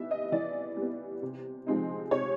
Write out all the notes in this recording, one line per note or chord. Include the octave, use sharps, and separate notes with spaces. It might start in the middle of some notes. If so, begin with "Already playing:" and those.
Already playing: E3 G3 B3 E5
D#5
E3 D5
G3 B3
C3
F3 G#3 C4 D#4
C3 C#5